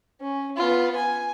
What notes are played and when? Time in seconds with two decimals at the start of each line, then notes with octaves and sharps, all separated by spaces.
0.21 C#4
0.56 B3 F4
0.96 G#5